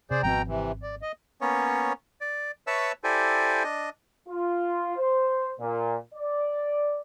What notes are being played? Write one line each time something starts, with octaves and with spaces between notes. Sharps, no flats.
C3 G#4 C5 D5
G#1 B2 F3 C4 G5 A#5
C3 E3
D5
D#5
A#3 B3 C#4 C#5
D5
B4 C#5 E5 A5 C#6 E6
E4 G4 A4 C5 D5 G#5
D4 D#5
F4
C5
A#2
D5